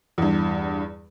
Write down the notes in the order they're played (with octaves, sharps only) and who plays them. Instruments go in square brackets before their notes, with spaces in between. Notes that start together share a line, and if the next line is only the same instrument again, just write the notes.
[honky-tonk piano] E2 G2